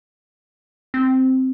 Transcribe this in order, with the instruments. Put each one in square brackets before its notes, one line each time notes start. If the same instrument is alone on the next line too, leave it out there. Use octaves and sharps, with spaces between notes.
[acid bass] C4